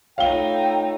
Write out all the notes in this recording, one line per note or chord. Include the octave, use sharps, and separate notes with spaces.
A3 D#4 F4 C#5 F5 G5 G7